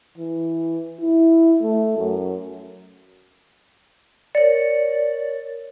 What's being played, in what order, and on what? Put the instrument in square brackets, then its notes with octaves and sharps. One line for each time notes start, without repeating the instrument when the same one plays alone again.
[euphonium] E3
E4
A3
F#2
[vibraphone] A#4 C#5 [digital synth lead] D5